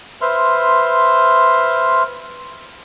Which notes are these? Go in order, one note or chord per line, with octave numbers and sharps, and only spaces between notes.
B4 C5 E5 C6 F6